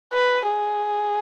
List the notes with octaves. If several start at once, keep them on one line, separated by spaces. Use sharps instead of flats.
B4
G#4